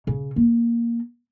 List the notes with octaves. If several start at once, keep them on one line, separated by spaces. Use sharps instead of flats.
C#3
A#3